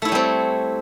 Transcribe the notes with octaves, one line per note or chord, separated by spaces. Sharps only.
G3 A3 C4 E4 C#5